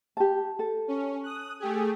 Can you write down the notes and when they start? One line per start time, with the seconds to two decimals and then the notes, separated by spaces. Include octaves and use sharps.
0.17 G4 A5
0.59 A4
0.88 C#4
1.23 D#6 F#6
1.60 A3 G4 G#4